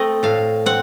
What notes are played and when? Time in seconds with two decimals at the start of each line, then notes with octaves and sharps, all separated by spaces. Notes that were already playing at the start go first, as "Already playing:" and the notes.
Already playing: A3 C4 D#5
0.23 A2 F5
0.66 C4 F#5